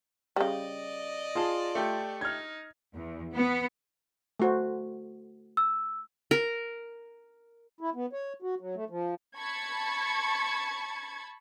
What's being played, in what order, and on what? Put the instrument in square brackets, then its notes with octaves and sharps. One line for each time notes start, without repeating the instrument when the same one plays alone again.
[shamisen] C#3 G3 [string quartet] D5 D#5
[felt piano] F4 [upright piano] G#4 A5
[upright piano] A3 G4 A4
[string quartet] D#4 [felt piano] F6 G#6
[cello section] E2
B3
[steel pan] A3 F#4 C5
[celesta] E6
[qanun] A#4
[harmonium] E4
B3
C#5
F#4
F#3
A3
F3
[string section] A5 B5 C#6 G#6